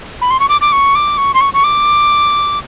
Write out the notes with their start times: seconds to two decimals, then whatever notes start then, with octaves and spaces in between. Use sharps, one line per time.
0.21 B5
0.30 C6
0.39 C#6
0.49 D6
0.61 D6
0.72 C#6
0.95 D6
1.17 C#6
1.34 C6
1.41 C#6
1.54 C#6
1.64 D6